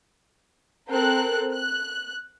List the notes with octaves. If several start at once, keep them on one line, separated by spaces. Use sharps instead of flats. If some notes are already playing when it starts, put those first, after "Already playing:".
C4 A4 A#4 F#6
F#6